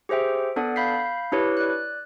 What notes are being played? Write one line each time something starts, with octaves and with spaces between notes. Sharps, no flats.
G4 G#4 C5 E5 G5
B3 D4 A4 D5 F#5
F5 B5 G6 B6 C7
D4 E4 G4 B4 C#5
D5 F#6